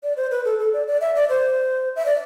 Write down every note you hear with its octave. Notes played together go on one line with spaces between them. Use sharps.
D5
C5
B4
A4
A4
D5
D5
E5
D5
C5
E5
D5